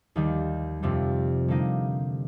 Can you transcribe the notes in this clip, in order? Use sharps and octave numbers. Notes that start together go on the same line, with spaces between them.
D#2 D#3 G3
F2 C3 G3
D3 G3 A#3 D#4